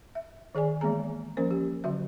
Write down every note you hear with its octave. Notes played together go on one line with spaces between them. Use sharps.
E5
D#3 G#4 D5 G#5
E3 G#3 A#3 B3 G#4 A#5
F3 A#3 C#4 A#4 C5
G4
D3 F#3 F#4 E5